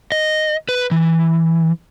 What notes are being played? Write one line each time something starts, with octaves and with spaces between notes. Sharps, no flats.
D#5
B4
E3